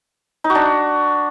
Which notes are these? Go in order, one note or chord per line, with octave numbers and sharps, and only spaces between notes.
D#4
F#4
D4